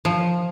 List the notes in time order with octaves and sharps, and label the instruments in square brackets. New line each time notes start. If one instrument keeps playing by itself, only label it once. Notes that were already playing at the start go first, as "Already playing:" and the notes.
[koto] F3